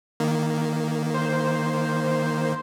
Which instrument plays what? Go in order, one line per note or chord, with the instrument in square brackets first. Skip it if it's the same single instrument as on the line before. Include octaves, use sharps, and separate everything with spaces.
[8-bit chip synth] D#3 A#3
[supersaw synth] C5